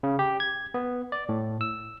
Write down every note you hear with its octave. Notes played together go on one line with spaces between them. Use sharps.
C#3
G4
G#6
B3
D5
A2
E6